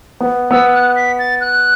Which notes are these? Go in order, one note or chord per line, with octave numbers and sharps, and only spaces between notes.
B3
B3 E6
F#6
B6
A6
F#6